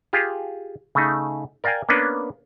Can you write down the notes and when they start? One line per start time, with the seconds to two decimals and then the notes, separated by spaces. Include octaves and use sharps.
0.13 F4 G4 G#4
0.95 C#3 A3 D#4
1.64 A#4 D5 F5 G5 G#5
1.89 A#3 B3 C#4 D4 B4